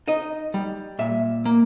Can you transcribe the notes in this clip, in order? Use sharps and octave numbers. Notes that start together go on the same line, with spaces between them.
D#4 D#5
G3
A#2 E5
A#3